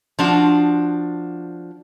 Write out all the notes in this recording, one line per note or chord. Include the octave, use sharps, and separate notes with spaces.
F3 D4 F#4